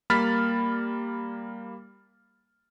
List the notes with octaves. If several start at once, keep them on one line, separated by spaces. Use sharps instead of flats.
G3 A#3 B5 F6 A6 B6